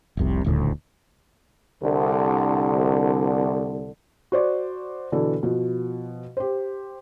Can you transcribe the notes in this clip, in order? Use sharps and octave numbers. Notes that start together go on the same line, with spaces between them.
F1 C2 C3
D#1 D2 A2
C2 D3
F#4 C5 D5
B2 D3 E3 A4
B2 F3
G4 C5